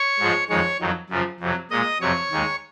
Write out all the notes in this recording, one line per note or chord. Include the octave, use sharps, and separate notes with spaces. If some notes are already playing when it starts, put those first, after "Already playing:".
Already playing: C#5 C#6
G#2 F3 G#3
F2 D#3 G#3 C#5 C#6
F2 D#3 F#3
F#2 C#3 F3
F2 C3 F#3
A#2 G#3 D#5 D#6
F2 C3 F#3 C#5 C#6
D#2 D#3 G#3